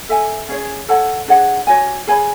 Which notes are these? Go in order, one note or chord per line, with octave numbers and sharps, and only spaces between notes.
A4 E5 G#5
C#4 G#4 C#5
A4 C#5 F#5 A5
D4 G#4 C#5 F#5
F#4 C#5 G#5
G#4 C#5 G#5 B5